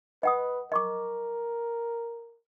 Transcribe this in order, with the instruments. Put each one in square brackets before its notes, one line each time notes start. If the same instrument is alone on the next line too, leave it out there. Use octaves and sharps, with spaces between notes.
[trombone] B4 [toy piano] D#5 F#5 D#6
[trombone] A#4 [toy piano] D#5 C#6 D6